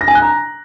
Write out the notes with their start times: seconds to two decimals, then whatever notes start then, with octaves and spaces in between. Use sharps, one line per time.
0.01 A#6
0.08 G#5
0.15 F#6
0.22 A#5